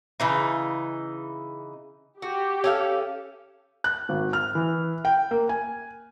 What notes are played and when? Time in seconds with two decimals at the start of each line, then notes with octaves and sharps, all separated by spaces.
0.20 C#3 E3 D#4
2.22 F#4 G4
2.64 C#4 A4 F5
3.84 F#6
4.09 G#1
4.33 F6
4.55 E3
5.05 G5
5.31 A#3
5.49 G#5